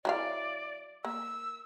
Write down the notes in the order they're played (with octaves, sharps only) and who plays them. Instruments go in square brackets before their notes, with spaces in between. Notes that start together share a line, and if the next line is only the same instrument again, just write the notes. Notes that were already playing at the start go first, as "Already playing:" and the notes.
[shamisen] F#3 E4 F5 [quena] D5
[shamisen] A#3 [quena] E6